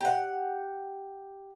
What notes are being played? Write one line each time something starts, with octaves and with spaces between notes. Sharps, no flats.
G4 F#5